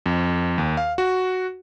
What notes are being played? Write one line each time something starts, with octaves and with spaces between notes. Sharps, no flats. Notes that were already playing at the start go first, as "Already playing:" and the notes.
F2
D#2
F5
F#4